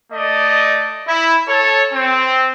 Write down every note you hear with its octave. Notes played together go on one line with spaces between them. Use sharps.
A3 D5 D#5
E4
A4 C#5
C4